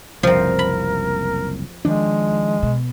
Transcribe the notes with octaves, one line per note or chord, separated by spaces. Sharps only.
F#1 C2 F3 C4 A#4
B5
D#3 F3 G#3 D4
B2